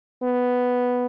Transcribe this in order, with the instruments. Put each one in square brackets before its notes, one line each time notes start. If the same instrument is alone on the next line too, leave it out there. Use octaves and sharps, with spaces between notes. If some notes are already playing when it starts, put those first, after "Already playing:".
[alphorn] B3